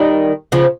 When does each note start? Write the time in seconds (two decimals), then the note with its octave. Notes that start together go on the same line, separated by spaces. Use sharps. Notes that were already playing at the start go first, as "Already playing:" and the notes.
Already playing: D#3 G3
0.52 C#3 F3